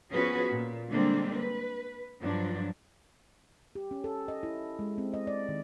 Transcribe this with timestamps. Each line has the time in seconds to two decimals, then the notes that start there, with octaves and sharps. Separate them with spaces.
0.11 F3 B3 C#4 F#4 G#4 B4
0.50 A#2
0.89 D3 G3 G#3 A#3 C4 D4
1.35 B4
2.20 G2 F3 F#3 D4
3.75 G4
3.91 C#4
4.04 A4
4.28 D#5
4.43 E4
4.79 G#3
4.98 C4
5.14 D#5
5.27 D5
5.49 D#3